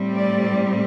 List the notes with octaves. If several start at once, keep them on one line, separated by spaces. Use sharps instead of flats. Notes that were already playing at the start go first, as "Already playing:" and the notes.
Already playing: A2 G3 C4
D5